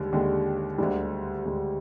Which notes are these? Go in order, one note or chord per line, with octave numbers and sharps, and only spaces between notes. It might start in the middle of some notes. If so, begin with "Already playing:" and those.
Already playing: D#2 D3 G3 G#3
D#2 D3 G#3 D4 G4
D2 D3 G3 G#3 D4
D2 D3 G#3 D4